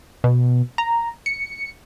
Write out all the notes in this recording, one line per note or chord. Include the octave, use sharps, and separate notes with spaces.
B2
A#5
C#7